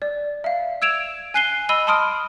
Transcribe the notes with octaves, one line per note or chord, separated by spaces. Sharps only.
D5
E5 F5
E6 G#6 D7 E7 F7
G#5 F#6 C7 D#7 G7
D#5 B5 E6 D#7 G7
A5 B5 C6 D#6 F6 D7